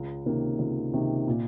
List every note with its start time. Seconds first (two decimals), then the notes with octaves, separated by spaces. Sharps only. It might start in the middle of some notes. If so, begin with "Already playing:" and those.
Already playing: C#2
0.26 C3 D#3 A#3 C#4
0.59 C#2
0.93 C3 D#3 A#3 C#4
1.28 A#2